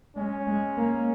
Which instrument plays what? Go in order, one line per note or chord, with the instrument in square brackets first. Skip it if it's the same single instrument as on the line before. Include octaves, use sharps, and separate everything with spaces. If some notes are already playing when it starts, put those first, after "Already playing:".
[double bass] G#3 [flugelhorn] C#4
[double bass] G#3
A#3